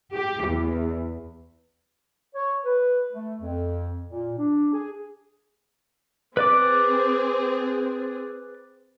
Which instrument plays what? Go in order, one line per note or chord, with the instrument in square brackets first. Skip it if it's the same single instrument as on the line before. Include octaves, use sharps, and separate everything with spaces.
[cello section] G4
E2
[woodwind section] C#5
B4
A3
F2
A#2
D4
G#4
[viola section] C4 G#4 [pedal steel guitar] B4 D5 D6